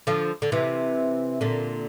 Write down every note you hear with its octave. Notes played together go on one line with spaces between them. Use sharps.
D3 F3
D3
C3 E3
A#2 D3